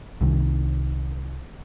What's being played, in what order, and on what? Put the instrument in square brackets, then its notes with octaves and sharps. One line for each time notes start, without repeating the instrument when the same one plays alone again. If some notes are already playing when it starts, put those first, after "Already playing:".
[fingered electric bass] C2 C3 D#3